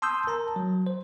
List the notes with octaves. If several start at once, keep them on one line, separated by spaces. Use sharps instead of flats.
A5 C6 D#6 E6 G6
A#4 A5 A#5
F#3
C5